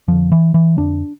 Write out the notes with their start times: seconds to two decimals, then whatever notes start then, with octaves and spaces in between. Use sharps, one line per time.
0.08 F2 D3 F3
0.32 E3
0.54 E3
0.77 F2 D3 D4